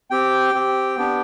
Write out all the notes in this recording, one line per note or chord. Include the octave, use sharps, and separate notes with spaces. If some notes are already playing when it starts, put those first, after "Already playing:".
C4 G4 G5
C4 G4
B3 D4 G4